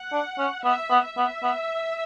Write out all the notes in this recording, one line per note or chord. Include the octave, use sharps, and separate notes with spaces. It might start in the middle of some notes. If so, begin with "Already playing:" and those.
Already playing: F#5
D4
C#4
B3 E5
B3
E5
B3
B3